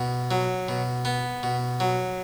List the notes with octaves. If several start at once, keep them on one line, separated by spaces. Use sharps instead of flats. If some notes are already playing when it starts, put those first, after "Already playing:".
Already playing: B2
F#3
B2
B3
B2
F#3